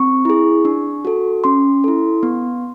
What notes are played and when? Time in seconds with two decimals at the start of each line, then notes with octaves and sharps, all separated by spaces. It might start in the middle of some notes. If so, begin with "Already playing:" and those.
Already playing: C4 C#6
0.25 E4 G#4
0.65 D4
1.05 F#4 A4
1.44 C#4 C6
1.84 E4 A4
2.23 B3